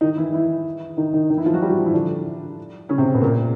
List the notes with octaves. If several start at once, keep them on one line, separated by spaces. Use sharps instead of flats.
D#3 D#4
E3 E4
E3 E4
D#3 D#4
D#3 D#4
D#3 D#4
E3 E4
F3 F4
F#3 F#4
G3 G4
F#3 F#4
F3 F4
E3 E4
D3 D4
C#3 C#4
C3 C4
B2 B3
A#2 A#3